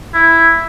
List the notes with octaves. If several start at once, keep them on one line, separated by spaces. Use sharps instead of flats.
E4